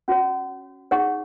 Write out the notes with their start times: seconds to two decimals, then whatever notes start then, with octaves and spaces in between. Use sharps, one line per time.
0.08 C#4 F#4 C#5
0.91 D#4 G#4 C#5 F#5 C#6